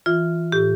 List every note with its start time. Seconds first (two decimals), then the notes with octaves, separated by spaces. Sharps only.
0.06 E3 F4
0.52 A2 G4